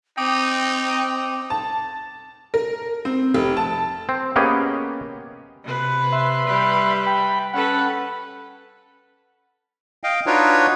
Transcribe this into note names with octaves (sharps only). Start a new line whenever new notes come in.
C4 D#4 G5 D6 D#6
A5
A#4
C4
F1
A5
C4
A#3 B3 C#4 G4 G#4 D#5
C3 B4
E5 C6
G3 G4 B4
G5 B5
C#4 A4 B4 F#5
D#5 F5 G5
D4 D#4 F4 F#4 B4 C#5